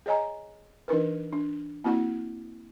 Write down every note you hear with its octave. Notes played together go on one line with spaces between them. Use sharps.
G#4 C#5 D#5 G#5 A#5
E3 D4 D#4 A#4 B4
D4
A#3 C4 E4 F#4 F#5